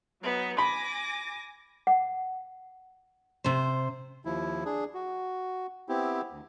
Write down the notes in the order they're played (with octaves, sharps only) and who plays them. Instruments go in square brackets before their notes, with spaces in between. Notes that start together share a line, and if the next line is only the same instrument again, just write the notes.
[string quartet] F#3 B3 D#4
[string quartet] G#5 D6 A#6 [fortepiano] B5
[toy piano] F#5
[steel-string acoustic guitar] C3 C5
[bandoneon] D#2 F3 E4
D4 G#4
F#4
B3 C4 E4 G4
D2